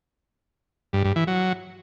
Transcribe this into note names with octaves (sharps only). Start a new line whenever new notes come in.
G2
G2
E3
F#3